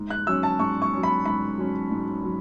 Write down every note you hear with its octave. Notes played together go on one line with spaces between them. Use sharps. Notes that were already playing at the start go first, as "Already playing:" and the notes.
Already playing: G#2
F#6
F#3 C#4 E6
A5
G#2 C#6
C#6
F#3 C#4
B5
G#2 B5
F#3 C#4
G#2
F#3